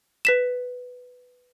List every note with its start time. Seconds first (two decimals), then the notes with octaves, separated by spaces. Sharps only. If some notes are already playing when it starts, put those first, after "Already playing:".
0.25 B4 B6 E7